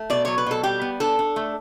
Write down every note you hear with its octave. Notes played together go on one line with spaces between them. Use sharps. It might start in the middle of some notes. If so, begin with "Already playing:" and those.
Already playing: A3
B2 D5
F#3 C#5
B4
B2 A4
G3 G4
B3
D4 A4
D4
A3